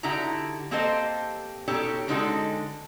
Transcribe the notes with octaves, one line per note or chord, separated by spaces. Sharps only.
D3 D#4 E4 F#4 G4 A#5
A#3 C4 G4 A4 C5 D#5
B2 D#4 G4 A4 C#5
D3 G#3 C#4 D#4 F#4 A4